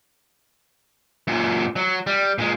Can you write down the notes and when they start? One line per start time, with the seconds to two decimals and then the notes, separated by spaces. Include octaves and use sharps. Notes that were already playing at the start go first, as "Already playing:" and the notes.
1.28 F#2 A#2
1.76 F#3
2.07 G3
2.38 A#2 G#3